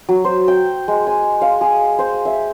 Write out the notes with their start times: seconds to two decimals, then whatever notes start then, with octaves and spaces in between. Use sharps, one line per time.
0.09 F#3
0.25 C5
0.48 G5
0.88 G#3
1.07 G#5
1.42 F5
1.61 G#4
1.99 C5
2.25 E5